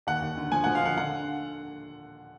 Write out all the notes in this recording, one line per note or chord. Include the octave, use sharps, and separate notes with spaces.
D#2 F#5
D#2
D3
F3 G#5
F3 F#5
F5
D3 F#5
D3 F#5